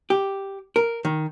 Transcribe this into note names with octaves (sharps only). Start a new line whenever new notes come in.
G4
A#4
D#3